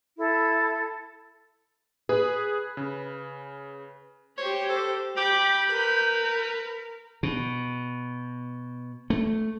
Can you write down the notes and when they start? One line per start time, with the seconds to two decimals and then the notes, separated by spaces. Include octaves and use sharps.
0.18 E4 A4
2.09 G#4 B4
2.77 C#3
4.38 G4 C5 C#5
4.70 A4
5.17 G4 B5 G6
5.69 A#4 B4
7.23 B2
9.10 A3